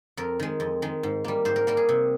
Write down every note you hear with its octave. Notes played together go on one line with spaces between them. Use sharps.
F2 A#4
D#3 G#3
F2
D#3 G#3
G#2
G3 A#3
G#2 C5
A#4
G3 A#3 A#4
G#4
C3